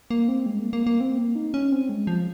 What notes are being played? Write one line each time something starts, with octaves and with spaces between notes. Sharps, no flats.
A#3
C4
G#3
A#3
A#3
A#3
C4
A#3
D#4
C#4
C4
G#3
F3